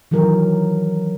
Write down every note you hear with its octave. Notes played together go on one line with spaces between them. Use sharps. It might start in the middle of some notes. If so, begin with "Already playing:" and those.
D#3 E3 F#3 A#4